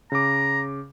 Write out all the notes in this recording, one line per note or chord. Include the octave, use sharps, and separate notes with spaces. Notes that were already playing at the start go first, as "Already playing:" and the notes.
C#3 A#5 D6